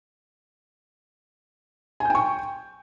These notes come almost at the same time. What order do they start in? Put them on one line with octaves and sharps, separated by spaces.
G#5 G6 G5 C#6